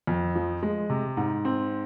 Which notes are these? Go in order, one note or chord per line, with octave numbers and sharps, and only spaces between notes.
F2
F3
G#3
C3
G#2
C4